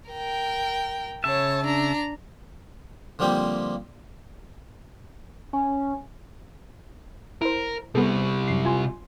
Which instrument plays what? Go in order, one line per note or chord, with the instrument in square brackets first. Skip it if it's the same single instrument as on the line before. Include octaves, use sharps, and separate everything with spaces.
[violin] A#4 G5
[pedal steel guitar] C#3 E5 [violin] C#5 A5
[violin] D4 A#5
[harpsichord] D3 F3 G3 A#3 C4 G4
[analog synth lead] C#4 [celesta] G#5
[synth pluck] E4 C5 [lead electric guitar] A#4
[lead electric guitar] C3 G3 [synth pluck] B3 G#4 A4
[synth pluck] F#2 C7
F4 G#5 C6